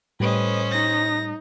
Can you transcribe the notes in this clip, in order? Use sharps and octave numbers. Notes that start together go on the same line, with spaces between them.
A2 G3 C#4 B4 C5 D#5
D#4 A#6